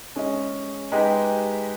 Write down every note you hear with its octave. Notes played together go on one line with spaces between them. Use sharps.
G#3 C#4 G#4 D#5
G#3 D#4 G4 B4